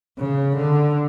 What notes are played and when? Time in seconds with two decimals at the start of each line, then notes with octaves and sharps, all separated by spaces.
0.19 C#3
0.56 D3